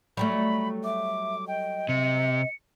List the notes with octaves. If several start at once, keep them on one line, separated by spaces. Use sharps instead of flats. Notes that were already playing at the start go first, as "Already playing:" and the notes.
F#3 G3 A3 B5
E5 D6
D#5 G5
C3 C#7